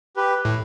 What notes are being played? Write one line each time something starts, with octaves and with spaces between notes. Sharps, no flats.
G4 B4
A2